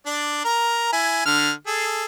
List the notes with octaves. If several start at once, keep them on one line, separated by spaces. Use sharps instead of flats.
D4 D5
A#4 A#5
E4 G#5
D3 F6
G#4 A4